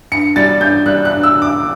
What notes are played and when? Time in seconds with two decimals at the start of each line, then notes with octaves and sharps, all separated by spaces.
0.12 G2 C#7
0.36 G3 A6
0.61 G2 G6
0.86 G3 F#6
1.05 F#6
1.11 G2
1.23 E6
1.36 D3
1.42 D6